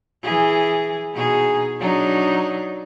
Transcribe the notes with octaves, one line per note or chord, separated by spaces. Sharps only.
E3 G#4
B2 D#4 G#4
F#3 D4 D#4